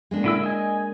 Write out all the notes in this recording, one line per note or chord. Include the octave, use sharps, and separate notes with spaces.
G#3 A#3 D4
D3 E4 E6
D#5 G#5